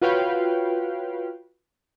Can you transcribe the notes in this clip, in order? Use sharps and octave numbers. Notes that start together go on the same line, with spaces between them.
F4 F#4 B4 C#5 F5 G5